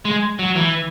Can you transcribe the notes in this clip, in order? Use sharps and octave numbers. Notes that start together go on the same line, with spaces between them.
G#3
F#3
E3